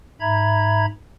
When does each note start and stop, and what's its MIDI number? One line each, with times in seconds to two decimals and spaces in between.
0.21 0.86 44
0.21 0.86 76
0.21 0.86 82
0.21 0.86 83
0.21 0.86 92